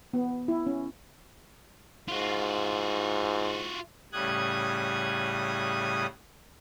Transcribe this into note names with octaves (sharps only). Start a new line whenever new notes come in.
B3
E4
C#4
G#2 F4 F#4
A2 C#3 G3 D#6 F#6 G#6